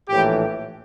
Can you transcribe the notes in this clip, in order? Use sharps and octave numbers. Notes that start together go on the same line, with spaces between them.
A#1 A2 E3 G4